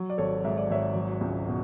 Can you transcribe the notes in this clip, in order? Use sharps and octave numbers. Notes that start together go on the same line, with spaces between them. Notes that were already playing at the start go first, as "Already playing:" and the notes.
Already playing: F#3
D5
G#1 A4 C#5
G#2 E5
D5
G#1 C#5 E5
F#3
C#2
B2